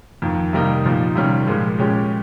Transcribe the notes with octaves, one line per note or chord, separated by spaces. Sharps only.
F2 D#3 A#3
C3 D#3 G3 A#3 D#4
A#2 F3 A#3 D#4
C3 D#3 G3 C#4 F4
A#2 F3 G#3
A#2 G#3 C#4 G4